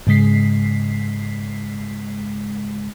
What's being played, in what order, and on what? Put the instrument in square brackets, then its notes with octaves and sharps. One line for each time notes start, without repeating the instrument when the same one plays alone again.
[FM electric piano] G#2 C#3 G#3 B6 C7